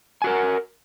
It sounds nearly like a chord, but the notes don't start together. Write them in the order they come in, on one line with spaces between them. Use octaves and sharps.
G#5 F#4 A#4